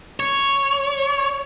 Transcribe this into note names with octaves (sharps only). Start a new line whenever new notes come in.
C#5